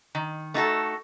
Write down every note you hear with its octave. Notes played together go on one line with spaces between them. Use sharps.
D#3
A3 D#4 F#4 A4